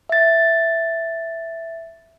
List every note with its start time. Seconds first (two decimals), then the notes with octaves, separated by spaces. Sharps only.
0.09 E5 A6